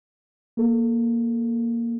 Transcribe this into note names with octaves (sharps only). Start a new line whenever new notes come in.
A#3 A4